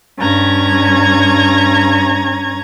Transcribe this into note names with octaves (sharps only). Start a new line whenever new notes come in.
G2 C#4 A#5 G#6